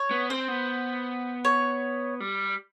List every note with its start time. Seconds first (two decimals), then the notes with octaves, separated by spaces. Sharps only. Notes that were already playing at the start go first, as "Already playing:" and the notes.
Already playing: C#5
0.11 B3
0.30 C4 C5
0.48 B3
1.45 C#5
2.20 G3